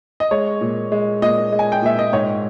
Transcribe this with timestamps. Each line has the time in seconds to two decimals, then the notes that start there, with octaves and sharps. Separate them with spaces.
0.20 D#5
0.31 G#3 C#5
0.61 A#2
0.92 G#3
1.22 A#2 D#5
1.52 G#3
1.59 G#5
1.72 G5
1.82 A#2 E5
1.99 D#5
2.13 G#2 C#5